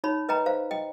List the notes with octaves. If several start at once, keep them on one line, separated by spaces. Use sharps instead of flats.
D#4 C#5 B5
B4 D#5 G5 A#5
C5 F5
D#5 G5